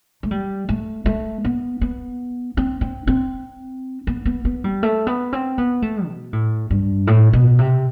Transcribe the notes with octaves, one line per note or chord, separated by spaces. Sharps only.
A3
G3
A3
A3
B3
B3
C4
C4
C4
B3
B3
B3
G3
A3
B3
C4
B3
A3
B2
A2
G2
A2
B2
C3